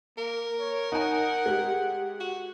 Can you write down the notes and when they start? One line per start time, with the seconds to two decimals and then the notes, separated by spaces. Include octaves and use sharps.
0.18 A#3 A#4
0.59 C#5
0.92 D#4 F#5 G#5
1.46 G#3 G4
2.20 F#4